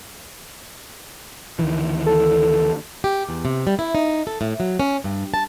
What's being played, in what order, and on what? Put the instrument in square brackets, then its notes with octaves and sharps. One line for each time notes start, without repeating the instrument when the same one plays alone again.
[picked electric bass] D2 D#3 E3
[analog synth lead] A4
[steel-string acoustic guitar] G4
E2
C3
G3
E4
D#4
A4
A2
F#3
C#4
G2
A5